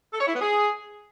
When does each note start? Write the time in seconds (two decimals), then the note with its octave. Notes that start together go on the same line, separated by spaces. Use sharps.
0.14 A4
0.20 C#5
0.27 E4
0.34 B3
0.41 G#4